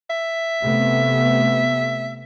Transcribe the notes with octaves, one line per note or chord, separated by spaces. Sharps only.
E5
C3 A3 B3